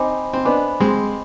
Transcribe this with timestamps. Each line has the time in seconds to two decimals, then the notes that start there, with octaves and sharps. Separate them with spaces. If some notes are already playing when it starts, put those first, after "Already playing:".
Already playing: C4 D#4 C5 D#5 G#5 B5 D6
0.33 C4
0.45 B3 D4 C5 D#5 G#5 B5 D6
0.80 G#3 C4